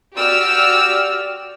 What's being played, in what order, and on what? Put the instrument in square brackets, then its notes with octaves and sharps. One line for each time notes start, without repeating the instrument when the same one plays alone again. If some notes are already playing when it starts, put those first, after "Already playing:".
[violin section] F#4 G4 D5 E6 F6